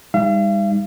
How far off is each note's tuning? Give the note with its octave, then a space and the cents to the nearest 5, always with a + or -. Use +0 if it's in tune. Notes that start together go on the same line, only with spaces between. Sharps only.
G3 +40 D#4 +0 F5 -45